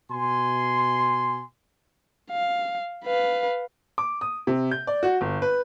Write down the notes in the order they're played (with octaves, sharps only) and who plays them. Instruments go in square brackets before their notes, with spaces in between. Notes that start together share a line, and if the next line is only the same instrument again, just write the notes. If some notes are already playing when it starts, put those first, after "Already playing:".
[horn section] B2 G#5 C6
[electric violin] F5
B4 F5
[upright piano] D6
D#6
C3
G6
D5
F#4
G1
B4